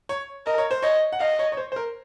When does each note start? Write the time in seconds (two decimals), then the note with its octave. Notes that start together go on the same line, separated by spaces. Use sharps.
0.09 C#5
0.46 A#4 D#5
0.58 C#5
0.71 C5
0.83 C#5 D#5
1.12 F#5
1.20 D#5 F5
1.39 C#5
1.52 C#5
1.57 C5
1.72 C5
1.76 A#4